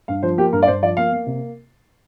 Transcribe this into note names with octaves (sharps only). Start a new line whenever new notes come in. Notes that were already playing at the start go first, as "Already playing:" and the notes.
G2 F5
F3 C5
A#3 G4
G2 A#4
D5
G2 C5
F3 D5
A#3 F5
A#3
C3